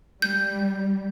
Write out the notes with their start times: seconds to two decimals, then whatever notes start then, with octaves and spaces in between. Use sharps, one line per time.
0.22 G3 G6